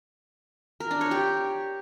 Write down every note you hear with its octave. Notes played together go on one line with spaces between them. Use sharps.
A#4
D4
C#5
G4